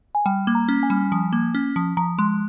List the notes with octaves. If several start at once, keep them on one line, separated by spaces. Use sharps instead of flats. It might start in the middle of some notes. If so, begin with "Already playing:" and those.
G#5
G3 G5
A#3
A#5
C#4
G#5
G3
F3
A#3
C#4
F3
F3 A#5
G#3 C6